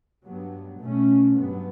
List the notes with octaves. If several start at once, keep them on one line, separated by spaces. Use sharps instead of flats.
G2 F#3 B3
B2 A3 C#4
G2 F#3 B3